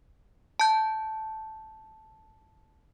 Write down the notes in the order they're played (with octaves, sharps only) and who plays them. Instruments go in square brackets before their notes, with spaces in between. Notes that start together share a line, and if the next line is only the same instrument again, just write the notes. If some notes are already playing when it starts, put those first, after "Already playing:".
[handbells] A5 G6